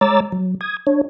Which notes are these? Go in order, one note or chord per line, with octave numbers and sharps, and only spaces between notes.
G#3 C#5 A#5 D6 E6 A6
F#3
D#6 G#6
D4 C#5